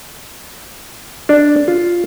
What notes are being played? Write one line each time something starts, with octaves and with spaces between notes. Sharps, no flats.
D4
F4